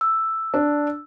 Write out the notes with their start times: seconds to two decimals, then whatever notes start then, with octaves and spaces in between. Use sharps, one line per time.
0.01 E6
0.54 D4